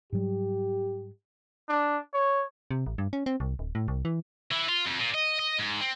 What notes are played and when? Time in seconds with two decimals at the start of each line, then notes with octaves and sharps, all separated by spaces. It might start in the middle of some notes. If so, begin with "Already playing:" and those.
0.12 G#2 F#3 G3 G4
1.69 D4
2.14 C#5
2.71 C3
2.86 A1
2.98 G2
3.13 C#4
3.26 C4
3.40 C2
3.59 D1
3.75 A2
3.88 C2
4.05 E3
4.51 E3
4.68 F4
4.86 F2
5.00 A#2
5.14 D#5
5.39 D#5
5.59 G#2
5.81 C4